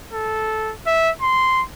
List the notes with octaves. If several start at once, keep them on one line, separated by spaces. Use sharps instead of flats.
A4
E5
C6